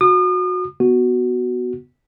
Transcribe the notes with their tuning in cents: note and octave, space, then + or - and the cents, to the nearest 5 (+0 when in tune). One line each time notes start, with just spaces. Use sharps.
F#4 -25 D#6 -40
B3 +0 F#4 +0